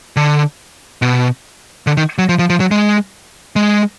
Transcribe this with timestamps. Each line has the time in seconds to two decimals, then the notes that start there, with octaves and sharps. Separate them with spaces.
0.17 D3
1.02 B2
1.87 D3
1.97 D#3
2.18 F#3
2.29 F3
2.39 F3
2.50 F3
2.60 F#3
2.71 G#3
3.56 G#3